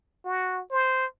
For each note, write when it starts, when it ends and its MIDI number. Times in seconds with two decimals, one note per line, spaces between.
0.24 0.61 66
0.71 1.06 72